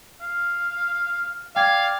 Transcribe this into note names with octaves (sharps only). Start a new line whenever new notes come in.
F5
D5 F5 G5 G#6